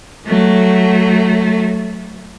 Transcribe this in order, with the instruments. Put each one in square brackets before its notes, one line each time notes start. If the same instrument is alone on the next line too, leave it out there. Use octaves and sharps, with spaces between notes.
[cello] F#3 A3